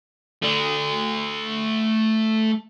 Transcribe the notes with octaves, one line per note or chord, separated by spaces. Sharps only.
A3 D5